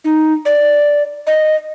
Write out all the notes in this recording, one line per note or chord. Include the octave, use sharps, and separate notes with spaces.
D#4
D5
D#5